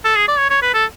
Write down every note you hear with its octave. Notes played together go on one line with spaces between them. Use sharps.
A4
G#4
D5
C#5
C#5
B4
A4